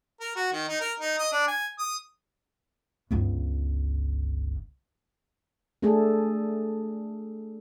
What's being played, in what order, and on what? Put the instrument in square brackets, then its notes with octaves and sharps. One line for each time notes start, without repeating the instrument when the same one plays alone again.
[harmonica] A#4
F#4
D#3
D#4
A#4
D#4
D#5
D4
G#5
D#6
[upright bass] G1 C#2
[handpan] A3 D4 G#4 A4